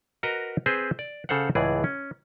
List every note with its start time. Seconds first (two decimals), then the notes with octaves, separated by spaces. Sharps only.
0.23 F#4 A#4 B4 D#5 A#5
0.66 C4 G#4 B4 C5
0.99 D5
1.29 C#3 A4 C5 F5 F#5
1.55 C#2 A2 E3 G#4 D5
1.84 C#4